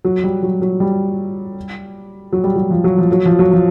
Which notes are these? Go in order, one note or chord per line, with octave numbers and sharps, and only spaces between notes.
F#3
G3
F#3
F#3
G3
F#3
G3
F#3
F3
F#3
F3
F#3
F3
F#3
F3